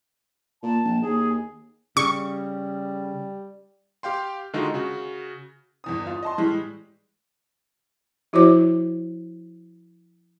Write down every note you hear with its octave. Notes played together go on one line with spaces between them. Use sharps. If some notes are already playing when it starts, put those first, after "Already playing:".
A#2 A5
A#1
D#2 G#4
C#3 G3 C#6
G4 F5 G5 C6
D3 D#3 G#3 D#4 F4 F#4
C#3 F#4
G1 E2 D#6
F4
D#5 A5 C6
A2 E3 G3 G#3
F3 E4 F#4 C5 C#5 D6